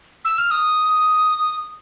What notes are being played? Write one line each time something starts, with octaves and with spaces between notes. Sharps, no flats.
E6
F6
D#6